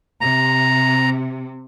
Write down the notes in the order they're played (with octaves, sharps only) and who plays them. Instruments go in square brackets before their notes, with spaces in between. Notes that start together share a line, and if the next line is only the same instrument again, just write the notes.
[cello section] C3 [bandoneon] A#5